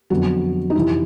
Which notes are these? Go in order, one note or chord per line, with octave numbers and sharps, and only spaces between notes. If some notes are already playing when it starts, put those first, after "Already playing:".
F2 D3 F#3 B3 F#4
D#4
F2 C3 E3 E4